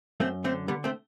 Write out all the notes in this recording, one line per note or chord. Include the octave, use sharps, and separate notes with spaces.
F#2 A3 C4
D3 A3 C4
D3 G3 B3
A3 C4